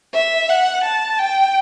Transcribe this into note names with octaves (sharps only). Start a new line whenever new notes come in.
E5
F#5
A5
G5